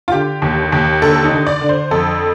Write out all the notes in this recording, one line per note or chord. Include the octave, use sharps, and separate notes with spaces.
F4
D3 G4
D#2
D#2
D3 A4
D#4
D3
D5
D3
C5
F2 A4